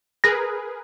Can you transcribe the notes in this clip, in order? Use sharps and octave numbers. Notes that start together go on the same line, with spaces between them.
G#4 A#4 B4 A#6